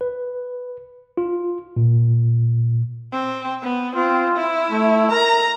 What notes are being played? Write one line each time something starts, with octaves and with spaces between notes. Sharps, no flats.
B4
F4
A#2
C4
B3
C4 F4
E4
A3
A#4 A#5